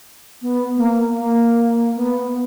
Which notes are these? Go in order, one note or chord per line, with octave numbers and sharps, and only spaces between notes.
B3
A#3
A#3
B3